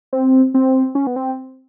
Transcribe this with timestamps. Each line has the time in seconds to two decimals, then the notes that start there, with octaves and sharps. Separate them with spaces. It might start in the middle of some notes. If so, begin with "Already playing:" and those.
0.13 C4
0.54 C4
0.95 C#4
1.07 B3
1.16 C4